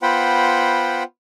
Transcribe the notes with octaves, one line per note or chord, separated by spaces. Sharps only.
B3 F4 C5 F#5 G5 B5